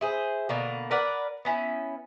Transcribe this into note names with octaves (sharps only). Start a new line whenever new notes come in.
E4 G#4 C5
B2 D3 A#3
A#4 B4 D5 F#5
B3 C#4 E4